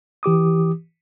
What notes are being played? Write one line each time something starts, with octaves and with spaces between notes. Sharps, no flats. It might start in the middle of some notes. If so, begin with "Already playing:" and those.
E3 G4 D6 D#6